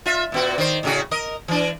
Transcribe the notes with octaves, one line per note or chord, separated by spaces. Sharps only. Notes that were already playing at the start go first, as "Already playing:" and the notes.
F4 E5
A#2 B3 F#4
D#3 C5
A2 C#3 F#4
A#4 D#5
E3 D4